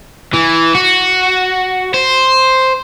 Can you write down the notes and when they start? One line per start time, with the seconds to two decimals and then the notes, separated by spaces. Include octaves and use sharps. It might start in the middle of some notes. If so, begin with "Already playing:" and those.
0.33 E3
0.75 F#4
1.94 C5